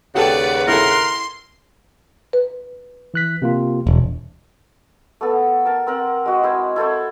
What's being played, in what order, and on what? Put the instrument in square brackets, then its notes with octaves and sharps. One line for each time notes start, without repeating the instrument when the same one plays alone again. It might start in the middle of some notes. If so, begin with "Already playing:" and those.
[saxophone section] D#2 C#3 F#5 [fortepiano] G4 A4 [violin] B4 D5
[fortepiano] E4 A4 [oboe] A#4 [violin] C6
[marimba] B4
[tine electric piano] E3 F#6 B6
C3 A#3 F4
[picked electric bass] E1
[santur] A3 B3 A4
A#4 A5
C4 A#4 F#5
G#3 F#4 D#5
E4 G#4 C5
E4 A4 C5 C#5